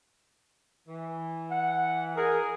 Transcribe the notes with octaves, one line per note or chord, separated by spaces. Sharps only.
E3
F#5
G#4 A#4